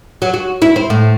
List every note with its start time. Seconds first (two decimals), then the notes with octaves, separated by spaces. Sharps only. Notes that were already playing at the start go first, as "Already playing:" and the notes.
0.22 F#3
0.34 F#4
0.62 E4
0.76 C4
0.90 A2